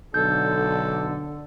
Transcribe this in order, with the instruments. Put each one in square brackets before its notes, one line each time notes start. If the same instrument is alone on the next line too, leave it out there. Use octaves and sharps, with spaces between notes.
[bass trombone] B1 [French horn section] D3 [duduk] A4 [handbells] G6